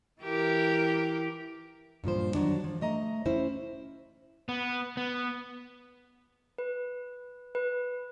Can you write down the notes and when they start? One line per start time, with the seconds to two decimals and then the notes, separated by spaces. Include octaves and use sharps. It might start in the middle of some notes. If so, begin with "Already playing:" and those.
0.22 E3 G4 A#4
2.04 G2 A#2 F3 C5
2.35 D#3 F#3 D4
2.64 F3
2.81 A3 D#5 A#5
3.26 C#4 E4 C5
4.49 B3
4.97 B3
6.58 B4
7.55 B4